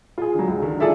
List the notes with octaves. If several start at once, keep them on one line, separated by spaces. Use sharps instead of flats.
F4 G#4
D3 F#3
C#2
D3 D#3
F4 G#4 A4 D5 E5